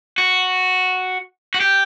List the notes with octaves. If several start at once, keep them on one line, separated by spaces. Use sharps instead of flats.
F#4
F#4
G4